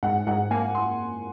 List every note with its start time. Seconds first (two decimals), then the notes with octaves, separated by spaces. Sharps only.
0.03 G#2 F#5
0.27 G#2 F#5
0.51 A#3 G#5
0.75 C6